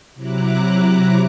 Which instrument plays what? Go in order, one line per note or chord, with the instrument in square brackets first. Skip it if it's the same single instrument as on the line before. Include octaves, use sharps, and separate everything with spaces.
[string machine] C3 F#3 E4 A#5 D6 F#6